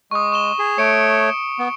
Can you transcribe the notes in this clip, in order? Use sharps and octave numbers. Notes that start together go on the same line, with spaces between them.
G#3 C#6 D#6
C#6 E7 G7
G#4
A3 C#5 C#7 D7
B3